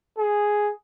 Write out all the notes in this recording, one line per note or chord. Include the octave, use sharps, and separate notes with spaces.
G#4